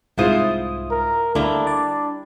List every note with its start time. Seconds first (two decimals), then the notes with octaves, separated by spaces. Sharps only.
0.18 C2 G#2 E4 F4 C5 D#6
0.91 A#4
1.35 D2 G3 A3 A#3 D4 E4 A#5
1.67 D5